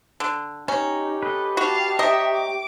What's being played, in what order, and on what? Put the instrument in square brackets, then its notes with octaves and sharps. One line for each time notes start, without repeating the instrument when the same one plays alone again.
[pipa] D3
[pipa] C#4 [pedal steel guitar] D#4 [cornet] G4
[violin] A4 [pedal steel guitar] B4 D#5
[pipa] F#4 [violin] F5 A5
[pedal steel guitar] C#5 G5 A#5 [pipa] D#5 [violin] E5
[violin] D6